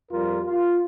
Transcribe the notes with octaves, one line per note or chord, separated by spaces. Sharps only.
F2 G3 F4 A#4
F4